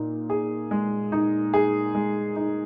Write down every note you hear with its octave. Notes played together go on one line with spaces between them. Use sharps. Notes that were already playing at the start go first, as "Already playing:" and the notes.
Already playing: A#2 D#4
G#4
G#3
D#4
G#4
G#3
D#4